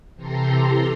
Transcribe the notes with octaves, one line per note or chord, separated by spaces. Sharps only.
C3 E3 G4 A4 A#5 C6